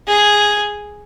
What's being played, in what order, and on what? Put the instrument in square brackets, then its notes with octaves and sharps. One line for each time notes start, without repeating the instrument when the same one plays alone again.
[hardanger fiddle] G#4